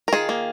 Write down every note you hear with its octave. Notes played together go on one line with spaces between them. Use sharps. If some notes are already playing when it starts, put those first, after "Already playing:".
A#4
D#3 F4 G#4
A#3